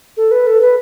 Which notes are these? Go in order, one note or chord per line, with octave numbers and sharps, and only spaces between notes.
A4
B4
A4
B4